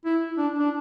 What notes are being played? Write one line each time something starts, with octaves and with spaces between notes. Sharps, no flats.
E4
D4
D4